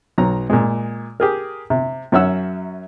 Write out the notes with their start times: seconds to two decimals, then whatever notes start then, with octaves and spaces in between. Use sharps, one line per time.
0.18 B1 F#3 A#5
0.50 A#2 G#3
1.20 G4 G#4 A#4
1.70 C3
2.12 F#2 F#3 C#4 E5 F#5 E6